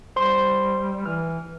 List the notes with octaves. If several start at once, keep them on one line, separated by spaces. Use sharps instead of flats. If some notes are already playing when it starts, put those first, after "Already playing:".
G3 C5 C6
E3 F6